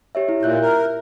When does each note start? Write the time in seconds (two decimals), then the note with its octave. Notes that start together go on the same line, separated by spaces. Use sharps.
0.15 G4 C#5 E5
0.29 E4
0.43 A#2 E5 F#6 G6
0.61 A#4